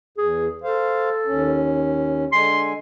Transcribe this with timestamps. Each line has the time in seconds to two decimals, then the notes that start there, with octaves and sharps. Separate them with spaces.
0.18 E2 G#4
0.63 A4 C5 F5
1.26 D#2 C#4
2.32 D3 G#3 G#5 C6